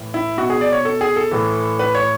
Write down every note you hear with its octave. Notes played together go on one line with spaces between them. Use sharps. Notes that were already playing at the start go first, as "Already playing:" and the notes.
Already playing: A2 E3
E4
B2 F#4
G#4
D5
C#5
A4
G#4
A4
A2 E3
B4
C#5